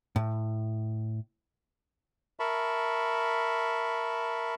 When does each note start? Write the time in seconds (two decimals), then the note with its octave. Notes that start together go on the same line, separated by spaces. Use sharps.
0.16 A2
2.40 A#4 E5 A5 B5 C#6